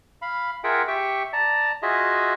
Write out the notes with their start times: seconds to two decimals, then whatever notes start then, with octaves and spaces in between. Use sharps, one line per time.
0.22 F5 B5
0.64 F4 G#4 A#4 E5 F#5 G5
0.88 G4 E5 G5 C#6
1.33 D5 A5 A#5
1.82 F4 F#4 G#4 D#5 E5